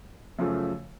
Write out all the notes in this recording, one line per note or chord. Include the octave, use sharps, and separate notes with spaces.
F#2 C#3 F3 A3